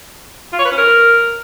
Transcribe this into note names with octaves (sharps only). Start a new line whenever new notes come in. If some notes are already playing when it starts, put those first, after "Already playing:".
F4
C#5
B4
C#4
A#4